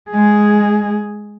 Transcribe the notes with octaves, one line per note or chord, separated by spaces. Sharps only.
G#3 G#4